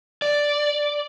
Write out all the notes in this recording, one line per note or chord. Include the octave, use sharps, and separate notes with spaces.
D5